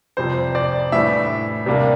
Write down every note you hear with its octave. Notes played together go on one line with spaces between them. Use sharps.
F2 C3 G3 C5
D5
A2 E3 G3 D4 E5
C3 G3 A#3 D4